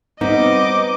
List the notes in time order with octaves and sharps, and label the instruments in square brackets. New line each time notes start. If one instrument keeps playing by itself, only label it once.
[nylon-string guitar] G3 B3 C4 [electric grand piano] D#4 [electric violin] D#5 D6